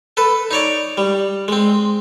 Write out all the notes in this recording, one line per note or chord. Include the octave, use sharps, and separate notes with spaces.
A4 B4
D#4 C#5 D5
G3
G#3 C4